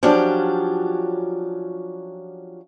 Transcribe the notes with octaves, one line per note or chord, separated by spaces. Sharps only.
F3 F#3 C#4 D4 G4